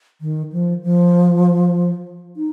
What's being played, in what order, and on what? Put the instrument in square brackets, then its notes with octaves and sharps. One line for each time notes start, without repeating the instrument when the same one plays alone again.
[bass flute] D#3
F3
F3
D#4